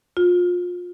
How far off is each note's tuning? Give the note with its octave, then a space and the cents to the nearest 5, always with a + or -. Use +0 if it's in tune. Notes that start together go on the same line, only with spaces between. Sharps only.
F4 +30